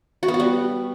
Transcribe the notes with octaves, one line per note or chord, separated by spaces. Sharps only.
F#4
B3
F#4
G3